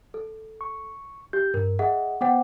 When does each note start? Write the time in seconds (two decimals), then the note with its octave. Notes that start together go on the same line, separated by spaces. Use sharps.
0.14 A4
0.61 C#6
1.33 G4 G6
1.54 G2 A#4
1.79 G#4 D#5 E5 F#5
2.21 B3 C5 F#5 G5 D6